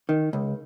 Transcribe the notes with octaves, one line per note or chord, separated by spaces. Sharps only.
D#3
C#2